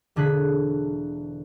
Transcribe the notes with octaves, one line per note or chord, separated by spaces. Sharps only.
E1 D3 G#4 F#6 B6